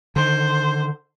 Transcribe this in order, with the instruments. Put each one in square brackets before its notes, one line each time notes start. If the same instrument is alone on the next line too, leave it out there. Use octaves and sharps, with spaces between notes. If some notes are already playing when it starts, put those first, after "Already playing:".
[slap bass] D3 D#3 [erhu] C5